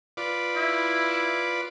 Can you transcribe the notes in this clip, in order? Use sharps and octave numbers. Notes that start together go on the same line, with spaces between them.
F4 B4 D5
E4